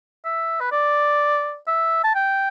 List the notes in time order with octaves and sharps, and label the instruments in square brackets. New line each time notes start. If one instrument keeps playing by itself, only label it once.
[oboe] E5
B4
D5
E5
A5
G5